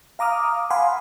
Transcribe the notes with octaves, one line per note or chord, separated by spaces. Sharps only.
F5 A#5 D6 D#6 F6
F5 F#5 G#5 B5 C6